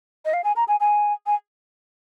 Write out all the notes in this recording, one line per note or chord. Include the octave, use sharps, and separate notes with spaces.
D#5
F5
G#5
A#5
G#5
G#5
G#5